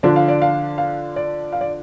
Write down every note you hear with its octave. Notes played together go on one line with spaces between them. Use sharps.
D3 F3 D4 D5
F5
D5
F5
F5
D5
F5
D5